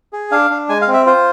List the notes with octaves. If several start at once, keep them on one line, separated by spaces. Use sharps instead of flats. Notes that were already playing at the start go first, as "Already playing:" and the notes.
G#4
D4 F5
D4
G#3 G#5
F5
C4
E5
F4 C5